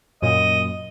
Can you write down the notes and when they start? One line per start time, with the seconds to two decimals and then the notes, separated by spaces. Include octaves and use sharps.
0.22 F#2 A#2 D#5